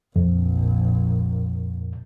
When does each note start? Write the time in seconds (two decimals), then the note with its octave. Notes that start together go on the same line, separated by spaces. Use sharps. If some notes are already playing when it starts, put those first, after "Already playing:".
0.16 A#1 F2